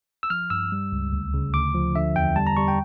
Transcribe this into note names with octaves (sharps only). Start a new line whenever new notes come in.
E6
F3 F6
G2 E6
G3
C#2
D2
C#3
D2 D6
F3
D3 E5
E2 G5
G3 A5
A#5
G3 C#6
G5